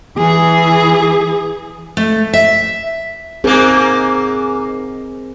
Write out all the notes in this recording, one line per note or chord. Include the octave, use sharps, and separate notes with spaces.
E3 G#4
A3
E5
G#2 A#3 C4 G#4 A#4